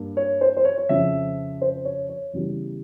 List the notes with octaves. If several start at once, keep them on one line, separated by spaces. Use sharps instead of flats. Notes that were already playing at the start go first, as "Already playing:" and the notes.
Already playing: G2 A#3
C#5
C5
C5
C#5
C#5
F2 C#3 F3 E5
C5
C#5
C#5
E2 C#3 E3 G3